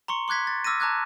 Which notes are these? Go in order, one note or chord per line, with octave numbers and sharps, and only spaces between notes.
A#5 C6 C#6 C#7
C6 D6 F#6 G#6 B6
A6
D6 E6 F6 A6 A#6 D#7
A5 A#5 D6 F#6 G#6